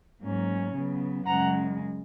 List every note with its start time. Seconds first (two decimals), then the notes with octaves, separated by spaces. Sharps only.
0.22 G#2 F#3 A#3 C#4
0.74 C#3 F#3 B3
1.26 F#2 C#3 G#3 F#5 A#5